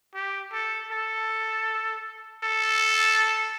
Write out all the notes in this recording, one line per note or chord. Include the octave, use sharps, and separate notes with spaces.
G4
A4
A4
A4